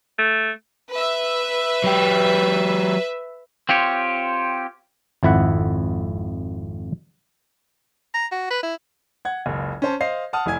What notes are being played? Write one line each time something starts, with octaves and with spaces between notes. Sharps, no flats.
A3
B4 E5
F#3 G4
C4 F4 G4 C#5
G#1 F2 E4 E5 F#5
A#5
F#4
B4
E4
F#5 G#6
F#1 C#2
C#4 C5 A5
C5 D#5 F5 C7
F#5 A5 D#6 F6
F1 E4 G#5 G#6